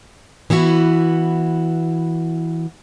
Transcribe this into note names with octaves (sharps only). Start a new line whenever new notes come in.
E3 B3 E4 F#4